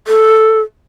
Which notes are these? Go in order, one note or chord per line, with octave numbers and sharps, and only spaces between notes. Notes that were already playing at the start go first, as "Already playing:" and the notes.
A4